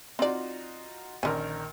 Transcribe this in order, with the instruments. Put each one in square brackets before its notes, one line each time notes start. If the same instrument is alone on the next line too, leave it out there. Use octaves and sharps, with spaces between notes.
[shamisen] C4 D5 [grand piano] D#4 F4 F#4
[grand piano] A#1 D#3 A#4 [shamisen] D3 C#4